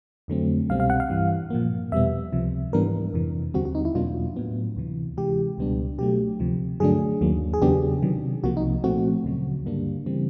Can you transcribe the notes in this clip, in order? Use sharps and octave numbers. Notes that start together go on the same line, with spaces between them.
F2 D3 F#3 A3 C4
C2 B2 G3 C4 F5
F5
F#5
F5
G2 E3 G3
A#2 F3 A#3
E2 B2 G3 B3 E5
C#2 C3 F3
G#2 E3 G3 B3 D4 A#4
F2 C3 E3
D#2 D3 G3 C4 F#4
F#4
D#4
E4
E2 B2 F#3 A#3 D4 F4
A2 F#3 B3
D2 C3 E3
C3 E3 G#3 G4
C#2 B2 G3 B3 D4
B2 F#3 A3 G4
D2 C3 F3
G2 D3 F#3 A3 D4 G#4
D#2 D#3 F#3 A#3
G#4
E2 C#3 F#3 B3 D4 G4
C3 D#3 F#3
C2 C3 F3 A#3 F#4
D#4
A#2 F3 A3 C4 F#4
D2 C#3 F#3
G2 D3 G3 A#3 D4
C#3 E3 G3 C4